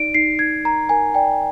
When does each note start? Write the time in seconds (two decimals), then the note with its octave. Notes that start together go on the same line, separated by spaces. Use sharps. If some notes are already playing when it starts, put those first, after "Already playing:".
Already playing: D#4 D5 D7
0.14 D#4 C7
0.39 D#4 G#6
0.64 A#4 A#5
0.89 A#4 G#5
1.15 D5 G5